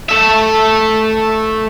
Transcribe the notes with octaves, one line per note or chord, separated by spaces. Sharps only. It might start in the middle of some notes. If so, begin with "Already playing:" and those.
A3 E5